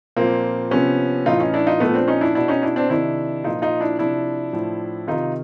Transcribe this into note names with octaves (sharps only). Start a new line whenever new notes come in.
A#2 F3 A#3 C4
C3 F3 B3 C#4
A2 E3 D#4 F4
C#4 D#4
D4 E4
D#4 F4
A#2 F3 A3 B3
C4 D4
C#4 D#4
D4 E4
B2 D4 E4
C#4 D#4
D4 E4
C4 D4
C3 D#3 D4 E4
A#2 F3 D#4 F4
D#4 F4
D4 E4
C3 F3 D4 E4
A2 F3
C3 D#3 D#4 F4